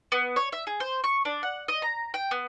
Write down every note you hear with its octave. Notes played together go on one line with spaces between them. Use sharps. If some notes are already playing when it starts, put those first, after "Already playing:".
B3
C#5
E5
G#4
C5
C#6
D4
F#5
D#5
A#5
G5
B3